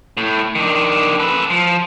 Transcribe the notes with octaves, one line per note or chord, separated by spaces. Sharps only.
A2
D#3 D4
A4 B4
F3